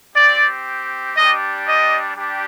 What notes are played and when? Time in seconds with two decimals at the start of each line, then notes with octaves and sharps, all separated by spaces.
0.16 C4 G4 D5
1.17 G3 D4 G4 D#5
1.66 D#5
2.17 G3 D4 G4